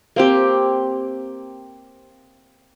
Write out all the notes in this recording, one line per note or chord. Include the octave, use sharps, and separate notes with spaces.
A#3 C4 G4